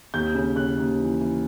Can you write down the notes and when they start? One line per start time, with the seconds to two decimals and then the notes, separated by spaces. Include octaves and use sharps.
0.14 D#2 G6
0.35 C#3
0.56 C#3 F#6
0.78 D#2
0.98 E3
1.20 E3